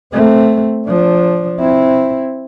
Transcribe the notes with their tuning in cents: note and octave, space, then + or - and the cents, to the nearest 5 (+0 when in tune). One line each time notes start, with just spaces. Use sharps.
A3 +0 C4 +0
F3 +0 D4 -25
C4 +5 E4 +0